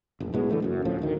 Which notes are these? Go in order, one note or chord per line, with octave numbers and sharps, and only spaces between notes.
F1 A#1
B1 A2 G#3 B3
D3 E3 A3 B3
F#1 F#2
D1 A2 F3
D2 D#3